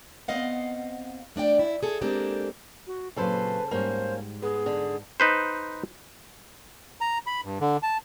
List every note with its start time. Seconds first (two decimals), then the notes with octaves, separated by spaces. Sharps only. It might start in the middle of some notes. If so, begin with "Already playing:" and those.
0.28 B3 C4 D#5 F5 F#5
1.36 A3 D4 D5 G5
1.59 E4
1.83 G#4 A4
2.01 G#3 A#3 C4 D4 G4 A4
2.87 F#4
3.16 A#2 C#3 F#3 C4 A4 B4 C5
3.71 G#2 G3 G#3 A#3 C#4 C5
4.42 B3 G#4
4.66 D3
5.20 D#4 B4 C5
7.01 A#5
7.26 B5
7.44 G2
7.61 D3
7.83 A5